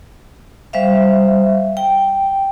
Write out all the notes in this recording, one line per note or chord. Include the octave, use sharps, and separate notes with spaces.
G3 C5 E5 F5
G5